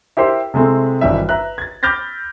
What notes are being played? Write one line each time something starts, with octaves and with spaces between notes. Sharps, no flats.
E4 G4 A#4 C5
C3 G#3 A3 C4 E4
G#1 G2 E3 G3 E5
B4 E5 A#5 F#6
G#6 A6
B5 D6 F6 G6 A6 A#6